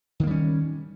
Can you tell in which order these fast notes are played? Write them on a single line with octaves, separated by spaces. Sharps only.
D#3 A#3 G3 C#4